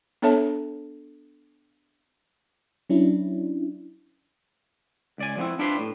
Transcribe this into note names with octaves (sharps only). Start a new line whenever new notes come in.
B3 D4 A4 C#5 E5 A5
F#3 C#4 D4 E4
C#2 D5 G#5
F3 G#3 B3 C4 E4
D4 E4 F4 G4 B4 C5
A2